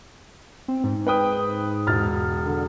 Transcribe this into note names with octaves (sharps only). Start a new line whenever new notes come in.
C4
G#2
B4 G5 D#6
E1 F6 A6
D3